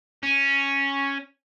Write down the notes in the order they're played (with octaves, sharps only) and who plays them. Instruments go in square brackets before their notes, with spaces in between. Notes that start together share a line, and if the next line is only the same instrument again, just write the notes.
[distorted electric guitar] C#4